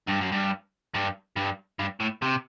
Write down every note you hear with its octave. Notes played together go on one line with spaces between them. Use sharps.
G2
F#2
G2
G2
G2
G2
A2
C3